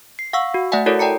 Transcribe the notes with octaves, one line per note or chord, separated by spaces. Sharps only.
C7
F5 F#5 C#6 E6
F#4
A3 D5 E5 F#5 G#5
E4 F#4 A4 A#4 C#5 D5
D5 G5 A5 A#5 C#7